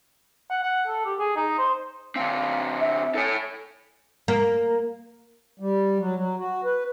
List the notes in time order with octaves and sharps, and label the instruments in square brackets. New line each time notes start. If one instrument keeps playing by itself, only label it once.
[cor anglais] F#5
F#5
A4
G4
G#4
D#4
C5
[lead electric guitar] D3 C4 [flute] F5
[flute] E5
[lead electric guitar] A4 C#5 [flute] G#5
[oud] A#3
[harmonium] G3
F#3
F#3
F#4
B4